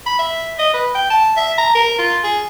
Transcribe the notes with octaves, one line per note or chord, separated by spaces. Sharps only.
B5
E5
D#5
B4
G5
A5
E5
A#5
A#4
F4
G#4